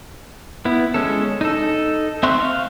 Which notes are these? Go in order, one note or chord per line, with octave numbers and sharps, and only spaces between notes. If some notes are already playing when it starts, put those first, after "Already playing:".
B3 E4
G#3 C#4 A4
D#4 A4
C4 E5 C6 C#6 F#6
F5